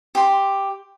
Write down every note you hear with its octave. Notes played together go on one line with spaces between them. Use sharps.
G4 C6